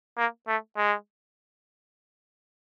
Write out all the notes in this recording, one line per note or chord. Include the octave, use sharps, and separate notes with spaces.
A#3
A3
G#3